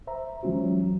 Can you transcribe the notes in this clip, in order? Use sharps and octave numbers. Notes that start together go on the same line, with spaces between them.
C5 E5 A#5
E3 F#3 G#3 C#4 F4 F#4